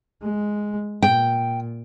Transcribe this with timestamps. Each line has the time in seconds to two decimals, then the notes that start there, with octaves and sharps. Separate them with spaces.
0.22 G#3
1.02 A#2 G5